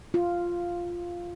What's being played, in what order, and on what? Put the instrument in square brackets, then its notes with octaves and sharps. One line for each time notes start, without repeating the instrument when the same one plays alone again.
[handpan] F4